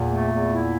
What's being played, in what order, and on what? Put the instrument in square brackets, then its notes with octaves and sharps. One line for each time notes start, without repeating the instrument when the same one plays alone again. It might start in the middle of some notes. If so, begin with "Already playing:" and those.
Already playing: [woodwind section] E2 [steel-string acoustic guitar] A#2
[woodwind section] A3
E2
E4